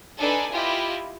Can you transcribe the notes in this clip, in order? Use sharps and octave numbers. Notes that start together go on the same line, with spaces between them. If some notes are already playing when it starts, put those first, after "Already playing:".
D4 D#4 A4 B4 D5 G#5
E4 F4 G4 D#5